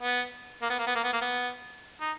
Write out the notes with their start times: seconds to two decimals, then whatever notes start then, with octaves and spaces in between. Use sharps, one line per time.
0.03 B3
0.62 A#3
0.70 B3
0.79 A#3
0.87 B3
0.95 A#3
1.04 B3
1.13 A#3
1.21 B3
2.01 D#4